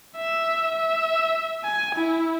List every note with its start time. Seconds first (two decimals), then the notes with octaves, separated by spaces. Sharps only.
0.17 E5
0.75 E5
1.64 G#5
1.95 E4